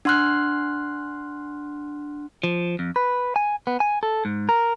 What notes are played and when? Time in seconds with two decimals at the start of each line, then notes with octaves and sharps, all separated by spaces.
0.05 D4 F#5 C6 F6 F#6
2.44 F3
2.79 F2
2.96 B4
3.36 G#5
3.67 B3
3.80 G#5
4.03 A4
4.25 G#2
4.49 A#4